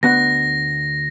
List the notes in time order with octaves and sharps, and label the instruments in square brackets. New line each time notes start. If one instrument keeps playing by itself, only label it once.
[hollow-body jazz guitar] D2 B3 F#5 [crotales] A#6